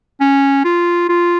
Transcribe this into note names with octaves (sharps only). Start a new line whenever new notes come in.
C#4
F4
F4